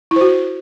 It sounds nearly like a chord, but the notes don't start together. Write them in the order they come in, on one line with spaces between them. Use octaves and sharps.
E4 C5 F#4